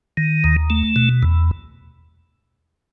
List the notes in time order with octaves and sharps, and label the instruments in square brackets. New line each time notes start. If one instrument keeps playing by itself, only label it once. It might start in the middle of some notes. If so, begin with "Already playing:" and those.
[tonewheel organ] D#3
D#2
A3
B2
E2